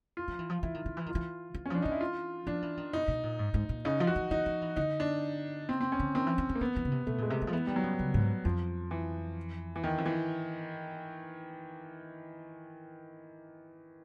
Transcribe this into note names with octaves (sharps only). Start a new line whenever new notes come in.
F4
F3
E3
F3
E3 E4
D#3
D#3
E3
D#3 F4
E3
E3
C#4
F3 D4
E3 D#4
E4
F4
F3 D4
E3
D#3
B2 D#4
B2
A#2
G#2
G#2
A#2
C#3 D#4
F3
F#4
F3
E3 D#4
F3
E3
D3 D#4
D4
C#3 C4
C4
C#4
D3
D#3 C4
E3
E3
E3
A#3
E3 B3
E3
C#3
C3
B2 A3
A#2 G#3
C3
E3
F3
E3 B3
D#3 G3
F#3
C#3
C#3
G#2
F2 F3
E3
E3
E2 D#3
F2
E3